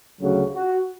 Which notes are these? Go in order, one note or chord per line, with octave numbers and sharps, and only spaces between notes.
D2 C#3 F#3 F#4
F#4